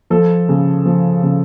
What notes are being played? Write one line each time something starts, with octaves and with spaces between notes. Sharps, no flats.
F3 A4
C#3
F3
C#3